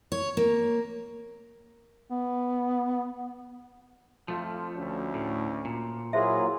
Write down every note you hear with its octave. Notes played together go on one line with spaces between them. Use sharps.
C#5
A#3
B3
F2 F3 A3 F4
D2 C#4 F#4
A2
A#2
F#3 A#3 E4 F4 G#4 C5 E5